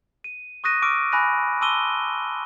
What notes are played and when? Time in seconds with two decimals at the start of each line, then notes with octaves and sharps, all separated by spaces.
0.24 D#7
0.64 C#6 D#6 F#6 A#6 D#7
0.82 C#6 D6 E6 F6 D7
1.12 G#5 B5 F#6 A#6 D#7
1.61 A5 C6 D6 E6 D#7 G7